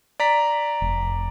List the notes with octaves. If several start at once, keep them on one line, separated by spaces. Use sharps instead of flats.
D5 A#5 B6
F1